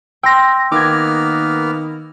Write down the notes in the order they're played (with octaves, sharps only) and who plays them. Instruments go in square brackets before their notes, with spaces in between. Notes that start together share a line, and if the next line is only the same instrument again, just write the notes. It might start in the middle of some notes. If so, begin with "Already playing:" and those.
[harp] G5 C6 F6 [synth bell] E6 A#6
[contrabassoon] D#3 [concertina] A#3 B3 F6 [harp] D6 G#6